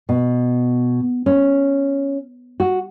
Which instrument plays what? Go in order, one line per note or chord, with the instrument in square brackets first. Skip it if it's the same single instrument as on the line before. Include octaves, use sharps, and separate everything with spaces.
[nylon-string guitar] B2
C#4
F#4